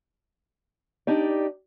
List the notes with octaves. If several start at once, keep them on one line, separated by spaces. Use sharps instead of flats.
D4 D#4 G4 D5